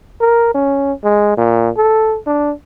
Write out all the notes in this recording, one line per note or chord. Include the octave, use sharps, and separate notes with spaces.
A#4
C#4
G#3
A#2
A4
D4